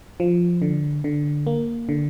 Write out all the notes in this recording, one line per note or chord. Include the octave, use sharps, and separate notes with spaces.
F3
D3
D3
A#3
D3